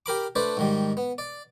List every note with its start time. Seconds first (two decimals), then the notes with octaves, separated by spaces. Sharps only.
0.06 G4 A#4 B5 D6
0.35 A3 D4 B4 C5 D5
0.57 G#2 D#3 G3
0.97 B3
1.18 D5